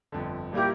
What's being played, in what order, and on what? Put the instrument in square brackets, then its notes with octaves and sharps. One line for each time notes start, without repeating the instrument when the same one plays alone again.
[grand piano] G1 F2 D3
[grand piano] A#2 G3 A#3 E4 A#4 [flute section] G4